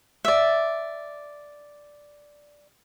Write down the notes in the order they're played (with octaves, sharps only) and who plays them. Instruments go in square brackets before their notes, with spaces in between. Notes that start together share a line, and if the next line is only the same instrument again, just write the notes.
[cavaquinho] D5 E5